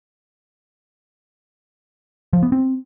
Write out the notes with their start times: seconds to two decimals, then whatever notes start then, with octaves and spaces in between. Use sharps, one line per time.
2.33 F3
2.43 B3
2.52 C4